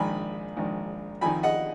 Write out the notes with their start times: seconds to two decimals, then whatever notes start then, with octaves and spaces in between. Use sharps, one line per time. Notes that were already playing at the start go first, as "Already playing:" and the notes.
Already playing: A#1 G#2 D#3 G#5 B5
0.57 A#1 G#2 D#3
1.21 F2 D#3 G#5 B5
1.43 D#5 F#5